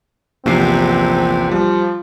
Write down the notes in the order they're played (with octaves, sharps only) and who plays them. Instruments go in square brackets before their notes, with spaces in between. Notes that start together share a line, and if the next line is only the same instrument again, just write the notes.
[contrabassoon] A#1 [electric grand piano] E2 C3 C7 [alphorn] C4
[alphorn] F3 [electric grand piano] G3